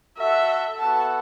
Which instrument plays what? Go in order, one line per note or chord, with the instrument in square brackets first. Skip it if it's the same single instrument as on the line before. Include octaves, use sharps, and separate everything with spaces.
[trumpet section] F#4 A4 F#5 [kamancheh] E5
[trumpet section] B3 F#4 A4 F#5 [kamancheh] A5